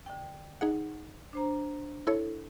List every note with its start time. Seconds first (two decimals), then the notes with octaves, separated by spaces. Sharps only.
0.06 D3 G5
0.61 D#4 G#4 F#5
1.33 D4 C5 A#5
2.07 E4 A4 C#5